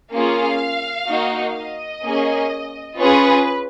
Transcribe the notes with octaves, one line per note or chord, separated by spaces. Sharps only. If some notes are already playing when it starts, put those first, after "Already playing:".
A#3 C#4 F4 G#4 F5
A#3 D#4 F#4
D#5
A#3 C#4 G#4
C#4 F4 G#4 B4